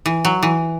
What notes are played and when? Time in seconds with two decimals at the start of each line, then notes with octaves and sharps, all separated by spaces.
0.06 E3
0.25 F#3
0.43 E3